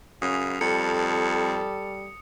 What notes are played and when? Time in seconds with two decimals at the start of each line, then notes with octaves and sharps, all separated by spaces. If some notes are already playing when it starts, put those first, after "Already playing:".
0.22 F#2 C#3 D#6
0.61 F2 G3 A4 C#7